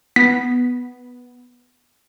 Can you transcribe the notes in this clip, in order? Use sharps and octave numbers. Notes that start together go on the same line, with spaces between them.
B3 B6